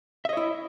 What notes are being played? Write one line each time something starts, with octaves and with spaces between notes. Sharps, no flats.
E4 C#5 D#5 E5